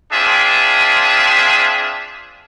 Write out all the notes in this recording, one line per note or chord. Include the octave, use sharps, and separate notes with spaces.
C4 D4 F4 G#4 E5